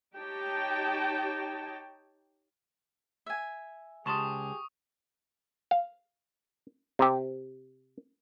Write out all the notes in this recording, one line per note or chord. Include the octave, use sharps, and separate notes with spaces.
D#4 G4 C#5 G5 A5
E5 G#5
C#2 G4 G#4 A5 C6 C#6 D#6
F5
C3 G4